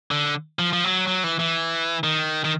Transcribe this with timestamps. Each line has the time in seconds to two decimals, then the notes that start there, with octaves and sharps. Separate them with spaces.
0.11 D3
0.59 F3
0.73 F3
0.84 F#3
1.07 F#3
1.24 E3
1.39 E3
2.04 D#3
2.44 D#3